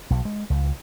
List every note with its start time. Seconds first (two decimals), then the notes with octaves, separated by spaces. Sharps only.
0.10 B1
0.25 G#3
0.50 C#2